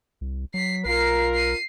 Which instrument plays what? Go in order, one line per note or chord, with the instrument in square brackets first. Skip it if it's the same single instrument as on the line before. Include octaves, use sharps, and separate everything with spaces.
[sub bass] C2
[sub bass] F#3 [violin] B6 C7
[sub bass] B1 [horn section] F4 A#4 [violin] C7
[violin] C7 D#7